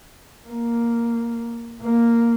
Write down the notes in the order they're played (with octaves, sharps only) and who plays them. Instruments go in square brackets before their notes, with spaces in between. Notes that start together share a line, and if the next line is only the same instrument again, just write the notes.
[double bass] A#3
A#3